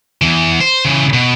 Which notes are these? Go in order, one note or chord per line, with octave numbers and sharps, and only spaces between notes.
E2 E3
C5
C#3 E3
B2